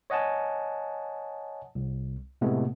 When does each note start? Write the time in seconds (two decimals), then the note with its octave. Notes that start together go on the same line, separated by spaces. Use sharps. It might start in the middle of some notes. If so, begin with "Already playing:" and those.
0.10 C#5 D#5 F#5 G#5 A5
1.75 C2
2.41 A2 C3 G#3 A3 B3